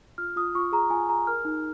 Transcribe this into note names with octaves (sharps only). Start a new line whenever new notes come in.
F4 F6
F4 D#6
F4 C#6
G#4 A#5
F4 G#5
G#4 A#5
A#4 F6
D#4